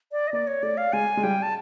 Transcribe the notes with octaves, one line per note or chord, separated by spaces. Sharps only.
D5
D#5
A#3 D5
C#5
A3 D5
F5
G#3 G#5
G#3
G3 G5
A5